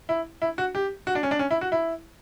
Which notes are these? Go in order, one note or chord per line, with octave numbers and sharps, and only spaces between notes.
E4
E4
F#4
G4
F#4
D4
C#4
D4
C#4
E4
F#4
E4